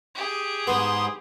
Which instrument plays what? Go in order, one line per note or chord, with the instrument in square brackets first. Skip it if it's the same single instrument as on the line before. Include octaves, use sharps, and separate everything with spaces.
[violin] G4 G#4
[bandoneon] G#2 C6 D#6 [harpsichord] B3